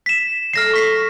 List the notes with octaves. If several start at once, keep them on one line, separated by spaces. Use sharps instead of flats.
B6 E7
F#3 A3 D5 F6 A#6 C7
C#6 B6 C7